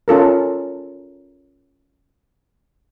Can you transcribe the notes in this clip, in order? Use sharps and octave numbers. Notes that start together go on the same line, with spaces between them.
C#4 F4 A4 A#4